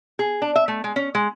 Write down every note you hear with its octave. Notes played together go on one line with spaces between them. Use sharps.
G#4
D4
E5
A3
G#3
C#4
G#3